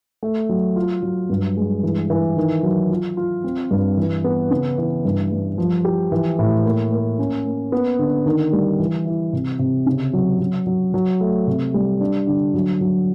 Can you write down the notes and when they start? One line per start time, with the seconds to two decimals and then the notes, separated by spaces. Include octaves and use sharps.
0.23 A3
0.49 F#3
0.76 F4
1.03 F#3
1.30 G2
1.57 G#3
1.83 E3
2.10 E3
2.37 D#3
2.63 F#3
2.90 F4
3.17 F4
3.44 C4
3.71 G2
3.97 E3
4.24 B3
4.51 C#3
4.78 E3
5.05 G2
5.31 G3
5.58 F3
5.85 G4
6.12 E3
6.39 A2
6.65 A#3
6.92 A#3
7.19 C#4
7.45 A#3
7.72 B3
7.99 D3
8.26 D#3
8.53 G3
8.79 E3
9.06 E4
9.33 C3
9.59 C3
9.86 C#3
10.13 F#3
10.39 F#3
10.67 F#3
10.94 F#3
11.21 A3
11.47 C3
11.74 G3
12.00 D4
12.27 D3
12.54 F#3
12.81 F#3